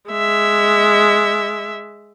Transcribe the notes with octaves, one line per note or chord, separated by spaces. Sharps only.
G#3 E5